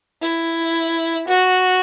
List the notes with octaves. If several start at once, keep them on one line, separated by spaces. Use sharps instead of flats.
E4
F#4